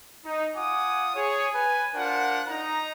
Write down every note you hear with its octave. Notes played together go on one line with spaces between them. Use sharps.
D#4
F4 F#5 G#5 D6 D#6
G#4 C#5
B4 G#5
D4 F4 A#4 C5 F#5
D#4 A#5